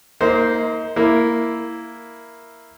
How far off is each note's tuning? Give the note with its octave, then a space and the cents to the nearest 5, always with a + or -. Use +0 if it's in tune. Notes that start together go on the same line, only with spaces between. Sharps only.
A#3 +0 D#4 +35 C5 -5
A#3 +0 E4 +0